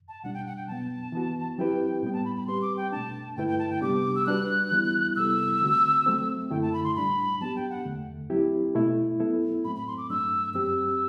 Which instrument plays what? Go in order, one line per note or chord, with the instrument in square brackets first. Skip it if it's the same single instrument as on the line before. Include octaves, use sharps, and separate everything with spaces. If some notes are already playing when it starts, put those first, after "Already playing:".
[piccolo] A5
[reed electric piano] B2 G3 D4 [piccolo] F#5
[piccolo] G5
F#5
G5
[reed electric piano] B2 F#3 B3 [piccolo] A5
[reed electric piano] E3 B3 F#4
[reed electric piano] F#3 C4 E4 G4 B4 [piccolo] G5
[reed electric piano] A2 G3 B3 [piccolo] G5
[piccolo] A5
B5
B5
[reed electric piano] G3 C4 G4 B4 [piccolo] C6
[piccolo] D6
G5
[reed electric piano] B2 A3 D4 [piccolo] A5
[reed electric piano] G2 D3 A3 E4 B4 [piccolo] G5
[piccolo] G5
A5
G5
[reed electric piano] C3 G3 B3 D4 G4 [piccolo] D6
[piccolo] E6
[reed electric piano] G3 D4 F#4 B4 [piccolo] F#6
[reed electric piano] E3 G3 B3 E4
[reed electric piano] C3 G3 B3 E4 A4 [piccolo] E6
[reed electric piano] D3 A3 C4 F#4
F#3 A3 C4
[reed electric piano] F#2 D3 A3 E4 [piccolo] G5
[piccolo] A5
B5
C6
[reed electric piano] A2 G3 D4 [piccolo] B5
[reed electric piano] F#3 B3 D4 G4 [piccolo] A5
[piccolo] G5
F#5
[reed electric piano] E2 D3 A3
F#3 C4 E4 G4
B2 A3 E4
F#3 B3 E4 A4
[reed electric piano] A2 F#3 A3 C4 [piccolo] B5
[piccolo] B5
C6
D6
[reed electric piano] G2 F#3 A3 D4 [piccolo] E6
[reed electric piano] F#2 F#3 C4 G4 [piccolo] E6